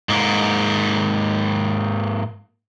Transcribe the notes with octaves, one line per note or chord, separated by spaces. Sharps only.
G#2 A#3